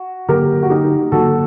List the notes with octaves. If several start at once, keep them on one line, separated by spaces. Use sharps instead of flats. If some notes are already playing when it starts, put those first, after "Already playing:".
Already playing: F#4
D3 F#3 A#3 G4 A#4
F#4
D#4 G4
D3 F#3 A#3 F#4 A4